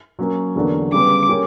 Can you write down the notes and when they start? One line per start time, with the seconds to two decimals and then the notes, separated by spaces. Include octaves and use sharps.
0.19 F#3 A#3 C#4
0.56 E2 D3 F#3 A#3 D4
0.92 C#3 G3 B3 D6
1.29 A#3 C#4 G4 A#4 C#5